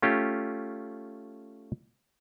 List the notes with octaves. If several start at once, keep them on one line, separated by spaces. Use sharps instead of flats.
A3 C#4 F4 G4